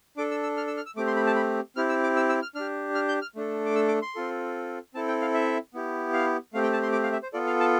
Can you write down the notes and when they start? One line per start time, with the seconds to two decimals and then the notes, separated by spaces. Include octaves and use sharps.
0.17 D4 A4 D6
0.31 E6
0.43 E6
0.57 F6
0.67 E6
0.77 F6
0.86 E6
0.96 A3 C4 G4 D6
1.07 C6
1.16 B5
1.27 A5
1.36 B5
1.76 C4 E4 G4 F6
1.89 E6
2.03 D6
2.16 E6
2.29 E6
2.42 F6
2.55 D4 G4 F6
2.95 F6
3.09 G6
3.22 F6
3.35 A3 D4 A4
3.66 D6
3.75 E6
3.88 D6
4.02 C6
4.15 C4 F4 A4
4.94 C4 E4 A4 A5
5.08 G5
5.21 F5
5.34 E5
5.74 B3 E4 G4
6.13 F5
6.53 A3 C4 G4 F5
6.63 G5
6.73 A5
6.83 C6
6.93 D6
7.04 F5
7.12 E5
7.23 C5
7.33 B3 F4 A4 D5
7.47 F5
7.60 A5